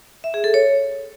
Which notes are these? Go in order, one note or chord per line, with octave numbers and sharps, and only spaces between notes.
E5
G#4
A4
C#5